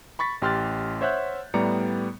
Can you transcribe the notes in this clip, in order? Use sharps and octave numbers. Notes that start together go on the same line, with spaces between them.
B5 C#6 A6 B6
A1 G4 C6 F6 F#6 A6
C5 C#5 E5 F#5 F#6 G6
A2 G3 B3 D5 A#5 C#7